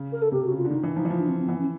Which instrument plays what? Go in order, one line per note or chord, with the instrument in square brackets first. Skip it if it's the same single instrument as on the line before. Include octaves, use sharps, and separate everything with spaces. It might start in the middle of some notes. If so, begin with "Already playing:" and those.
Already playing: [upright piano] C#3
[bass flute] A#4
A4
[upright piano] C3 [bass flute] G4
[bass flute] F#4
[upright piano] C#3
[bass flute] F4
[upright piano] D3
[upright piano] D#3 [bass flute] D#4
[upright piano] E3 [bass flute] D4
[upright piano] F3 [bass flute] D#4
[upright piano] E3
F3
[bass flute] D4
C4
C4
[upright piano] E3 [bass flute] B3
[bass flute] C#4